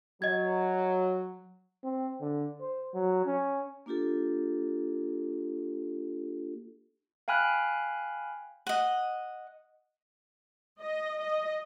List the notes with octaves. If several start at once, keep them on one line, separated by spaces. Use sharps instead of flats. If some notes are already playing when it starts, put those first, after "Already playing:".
F#3 D#5 G#6
C4
D3
C5
F#3
C#4
A#3 D4 F4 G4 A4
F5 G5 G#5 B5 F6 F#6
D#5 F#5
D#5
D#5